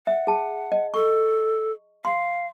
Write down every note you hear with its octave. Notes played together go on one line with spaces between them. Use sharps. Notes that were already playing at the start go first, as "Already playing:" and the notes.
E5 F#5
G#4 A5
D#5
A4 C#6
F5 C6